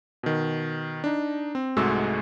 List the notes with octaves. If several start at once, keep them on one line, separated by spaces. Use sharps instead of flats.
B2 D#3
D4 D#4
C4
C2 G#2 G#3 A3 F#4 E6